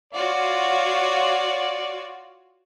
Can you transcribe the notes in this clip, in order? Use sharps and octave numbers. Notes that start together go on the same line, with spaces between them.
F4 F#4 C#5 D5